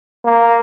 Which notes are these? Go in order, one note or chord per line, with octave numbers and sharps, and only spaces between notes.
A#3